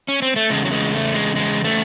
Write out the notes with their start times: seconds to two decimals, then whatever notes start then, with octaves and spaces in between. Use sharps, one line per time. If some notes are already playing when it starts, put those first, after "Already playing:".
0.08 C#4
0.22 C4
0.36 A3
0.50 E2 C#3 G#3
0.65 F#3
0.71 G#3
0.93 A3
1.14 G#3
1.36 G#3
1.64 A3